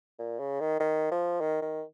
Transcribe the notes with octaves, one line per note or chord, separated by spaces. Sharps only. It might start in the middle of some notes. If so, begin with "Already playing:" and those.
A#2
C#3
D#3
D#3
F3
D#3
D#3